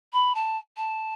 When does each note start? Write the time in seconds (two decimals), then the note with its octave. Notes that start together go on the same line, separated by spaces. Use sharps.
0.13 B5
0.35 A5
0.77 A5